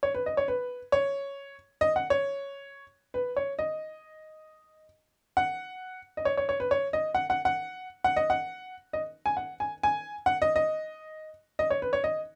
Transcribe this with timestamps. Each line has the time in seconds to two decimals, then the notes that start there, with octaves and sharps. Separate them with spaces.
0.03 C#5
0.14 B4
0.26 D#5
0.37 C#5
0.48 B4
0.92 C#5
1.81 D#5
1.96 F#5
2.10 C#5
3.14 B4
3.37 C#5
3.59 D#5
5.37 F#5
6.17 D#5
6.25 C#5
6.37 C#5
6.49 C#5
6.60 B4
6.71 C#5
6.93 D#5
7.15 F#5
7.30 F#5
7.45 F#5
8.04 F#5
8.16 D#5
8.30 F#5
8.93 D#5
9.26 G#5
9.37 F#5
9.60 G#5
9.83 G#5
10.26 F#5
10.42 D#5
10.56 D#5
11.59 D#5
11.70 C#5
11.82 B4
11.93 C#5
12.04 D#5